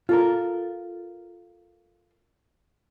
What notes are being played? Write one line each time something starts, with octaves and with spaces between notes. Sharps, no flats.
F4 A4 A#4